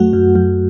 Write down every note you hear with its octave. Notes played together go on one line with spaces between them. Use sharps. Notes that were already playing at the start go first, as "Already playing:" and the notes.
Already playing: F#2 F#3 A3 F#4
F#2
F#2